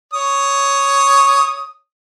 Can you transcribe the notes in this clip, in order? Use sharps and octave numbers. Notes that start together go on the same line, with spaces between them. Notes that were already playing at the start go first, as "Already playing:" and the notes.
C#5 D#6